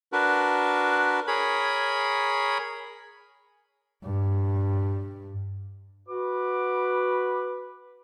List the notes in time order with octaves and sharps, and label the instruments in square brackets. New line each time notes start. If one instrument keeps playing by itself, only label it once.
[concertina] D4 F#4 A#4 B4
G#4 A#4 C#5 B5
[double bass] G2
[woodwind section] F#4 D6 [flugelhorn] B4